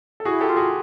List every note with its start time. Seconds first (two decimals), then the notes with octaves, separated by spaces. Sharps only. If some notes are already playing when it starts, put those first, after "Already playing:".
0.20 A4
0.25 E4 F#4 G#4
0.41 G4 A4
0.49 F4
0.56 F#4 G#4